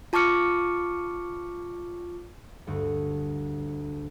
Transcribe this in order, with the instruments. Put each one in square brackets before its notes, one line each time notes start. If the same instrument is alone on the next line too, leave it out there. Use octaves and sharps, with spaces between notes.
[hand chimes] F4 A5 C#6 D6 F6 C#7
[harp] D2 G2